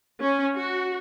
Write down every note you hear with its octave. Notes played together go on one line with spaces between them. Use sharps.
C#4
F#4